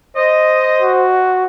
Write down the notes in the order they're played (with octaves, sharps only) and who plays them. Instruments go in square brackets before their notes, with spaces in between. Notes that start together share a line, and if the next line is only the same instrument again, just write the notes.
[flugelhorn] C5 [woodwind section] D#5
[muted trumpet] F#4